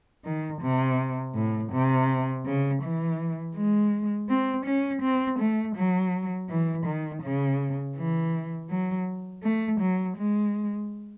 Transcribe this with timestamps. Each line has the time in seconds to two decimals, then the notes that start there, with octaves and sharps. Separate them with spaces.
0.24 D#3
0.61 C3
1.34 A2
1.72 C3
2.45 C#3
2.82 E3
3.55 G#3
4.29 C4
4.65 C#4
5.02 C4
5.39 A3
5.76 F#3
6.49 E3
6.86 D#3
7.22 C#3
7.96 E3
8.69 F#3
9.43 A3
9.80 F#3
10.17 G#3